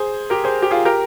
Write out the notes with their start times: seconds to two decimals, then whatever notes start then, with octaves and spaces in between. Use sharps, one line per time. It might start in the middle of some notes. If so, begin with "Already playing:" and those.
Already playing: G#4 C5
0.30 G4 A#4
0.44 G#4 C5
0.62 G4
0.71 F4 G#4
0.85 G4 A#4